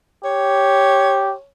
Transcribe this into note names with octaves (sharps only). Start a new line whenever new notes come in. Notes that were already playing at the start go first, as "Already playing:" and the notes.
G4 C#5